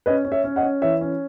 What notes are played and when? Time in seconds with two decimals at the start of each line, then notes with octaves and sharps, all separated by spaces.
0.06 C#4 B4 D#5
0.25 C#4
0.32 C#5 E5
0.44 C#4
0.56 D#5 F#5
0.63 C#4
0.82 E3 C#5 E5
1.01 C#4